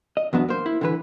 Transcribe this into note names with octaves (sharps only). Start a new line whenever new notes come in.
D#5
E2 F#3 B3 D4
A#3 C5
E4
D3 E3 B4